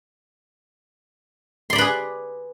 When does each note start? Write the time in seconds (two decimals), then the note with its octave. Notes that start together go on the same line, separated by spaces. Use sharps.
1.70 C6
1.73 D5
1.76 B5
1.78 B4
1.81 G#4